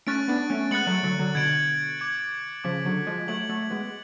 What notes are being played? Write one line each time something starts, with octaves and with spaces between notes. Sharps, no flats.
A3 C#4 C#6 F#6 A6 D7
B3 D4
A3 C#4
G#3 B3 F#6 A6 C#7 F#7
F#3 A3
D3 F#3
D3 F#3
B2 D3 G#6 D7 F#7
D6 G#6 D7 F#7
C#3 F3 D6 F#6 B6
D3 F#3
F3 G#3
F#3 A3 G#6 D7 F#7
F#3 A3
G#3 B3